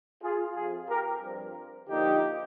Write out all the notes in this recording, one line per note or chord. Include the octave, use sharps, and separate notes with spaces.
F4 G#4
F2 C3 F3 F4 G#4
G4 A#4
G2 F3 C4
D3 F3 A#3 D#4 G4